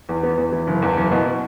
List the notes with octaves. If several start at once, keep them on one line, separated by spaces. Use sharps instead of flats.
E2
B3
E2
E3
F#1
E2
F#1
B2